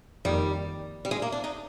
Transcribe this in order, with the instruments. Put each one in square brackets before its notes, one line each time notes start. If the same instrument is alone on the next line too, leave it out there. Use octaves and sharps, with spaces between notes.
[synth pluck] F2 D#3 A#3 D#4 [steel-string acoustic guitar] G3
[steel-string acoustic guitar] G3
G#3
A#3
D4
D#4